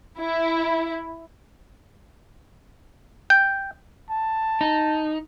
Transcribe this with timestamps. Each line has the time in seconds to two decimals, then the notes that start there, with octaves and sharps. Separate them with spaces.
0.20 E4
3.30 G5
4.10 A5
4.61 D#4